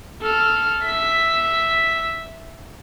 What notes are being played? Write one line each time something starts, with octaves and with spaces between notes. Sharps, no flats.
A4 F6
E5 B6